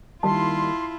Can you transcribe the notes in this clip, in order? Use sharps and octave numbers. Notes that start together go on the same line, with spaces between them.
D#3 G3 A#3 E4 F4 A5 C6